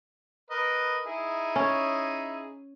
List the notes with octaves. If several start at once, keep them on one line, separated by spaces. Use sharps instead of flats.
A#4 B4 D#5
D#4 E4 G#4
C#4